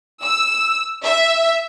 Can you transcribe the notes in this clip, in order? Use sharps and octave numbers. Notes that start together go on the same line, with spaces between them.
E6
E5